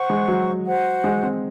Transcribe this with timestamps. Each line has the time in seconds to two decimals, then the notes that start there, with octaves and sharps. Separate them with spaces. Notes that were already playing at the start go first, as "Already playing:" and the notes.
Already playing: C5 F#5 C#6
0.10 G#3
0.28 F#3
0.66 F#4 C5 F#5
1.04 G#3
1.23 C4